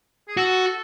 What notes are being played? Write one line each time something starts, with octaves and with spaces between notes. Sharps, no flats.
G#4
F#4 A4